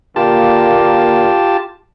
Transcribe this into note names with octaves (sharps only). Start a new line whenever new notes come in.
A#2 D3 A#3 F4 G4 A5